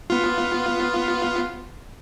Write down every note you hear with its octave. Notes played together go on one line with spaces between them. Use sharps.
B3 F4